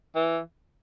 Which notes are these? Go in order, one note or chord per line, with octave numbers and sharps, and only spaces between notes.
E3